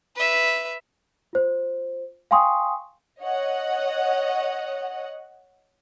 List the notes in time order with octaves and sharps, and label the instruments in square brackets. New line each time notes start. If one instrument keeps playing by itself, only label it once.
[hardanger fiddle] B4 E5
[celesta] F4 C5
F5 G5 G#5 C6 C#6 D#6
[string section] C#5 D#5 F#5